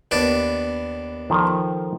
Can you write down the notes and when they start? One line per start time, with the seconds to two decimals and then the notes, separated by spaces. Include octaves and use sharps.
0.11 D#2 B3 D4
1.30 D#3 F3 A4